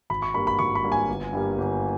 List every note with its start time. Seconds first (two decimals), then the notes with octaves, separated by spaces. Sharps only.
0.10 G#1 B5
0.22 C#6
0.34 G2 G3 A#3 B5
0.47 B5
0.59 G#1 C#6
0.75 B5
0.84 G2 G3 A#3
0.92 G#5
1.08 G1
1.32 G2 G3 A#3
1.58 G1